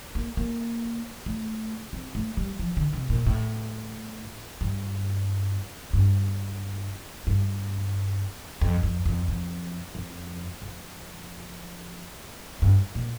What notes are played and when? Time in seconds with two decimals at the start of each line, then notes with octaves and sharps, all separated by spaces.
0.15 A#3
0.37 A#3
1.26 A3
1.93 C4
2.15 A3
2.37 G3
2.59 F3
2.77 D3
2.93 C3
3.10 A#2
3.27 A2
4.61 G2
5.93 G2
7.27 G2
8.61 F2
8.83 F2
9.05 F2
9.28 F2
9.95 F2
10.62 F2
12.62 G2
12.95 A#2